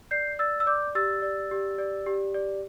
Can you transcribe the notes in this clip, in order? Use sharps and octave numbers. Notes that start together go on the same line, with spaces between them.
D5 G6 C7
D5 E6 A6
E6
D5 D6 G6
G4 E6 A6
D5
G4
D5
G4
D5